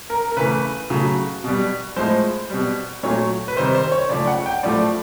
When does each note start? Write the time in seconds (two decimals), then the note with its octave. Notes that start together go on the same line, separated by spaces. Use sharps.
0.10 A#4
0.32 A#4
0.37 C#3 E3 A3 B4
0.90 C#3 F#3 A3
1.44 B2 G3
1.96 A2 F3 G#3 C5
2.50 B2 G3
3.03 A#2 F#3 A3 C#5
3.48 B4
3.57 C3 D#3 G3 C5
3.75 C5
3.92 C#5
4.09 C#3 F3 A3 D5
4.27 F#5
4.46 G5
4.63 A2 F3 A3 D5